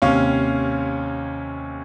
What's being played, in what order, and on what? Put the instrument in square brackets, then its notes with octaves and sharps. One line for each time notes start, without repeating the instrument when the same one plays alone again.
[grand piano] D#2 C3 C#4 F5 C#6 F6